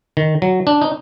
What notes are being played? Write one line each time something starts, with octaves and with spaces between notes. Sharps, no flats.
D#3
F#3
D4
D#4